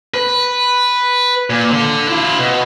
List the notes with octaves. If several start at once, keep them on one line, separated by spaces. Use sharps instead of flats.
B4
A#2
D3
E4 F4
B2